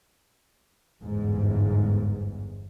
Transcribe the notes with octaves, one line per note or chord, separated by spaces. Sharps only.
G1 E2 G#2